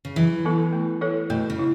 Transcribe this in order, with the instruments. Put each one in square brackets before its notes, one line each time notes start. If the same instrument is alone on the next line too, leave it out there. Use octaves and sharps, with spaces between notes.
[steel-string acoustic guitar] C#3
[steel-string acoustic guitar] E3 [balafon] F#3
[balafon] B3 E4 A4
A3
E4 A4 C#5
[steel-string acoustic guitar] B2 [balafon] A3
[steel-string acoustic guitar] C#3
[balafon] E4